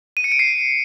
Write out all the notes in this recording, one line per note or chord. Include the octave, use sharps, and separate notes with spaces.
D#7
C#7
D7
C7